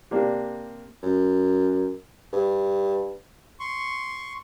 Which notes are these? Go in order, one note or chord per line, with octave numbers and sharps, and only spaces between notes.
C3 A#3 D4
F#2
G2
C6 C#6